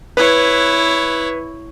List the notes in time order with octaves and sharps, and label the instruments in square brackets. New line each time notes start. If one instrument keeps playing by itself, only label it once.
[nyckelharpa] E4 C#5 [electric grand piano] B4